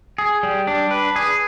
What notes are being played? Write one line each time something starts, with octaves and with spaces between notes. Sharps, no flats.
G#4
G3
D4
B4
G#4